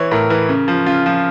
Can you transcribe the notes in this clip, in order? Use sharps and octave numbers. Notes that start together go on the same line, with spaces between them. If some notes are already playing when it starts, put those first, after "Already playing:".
Already playing: E3 C#5
A2 A#4
E3
C#3
F3
C#3 F4
F3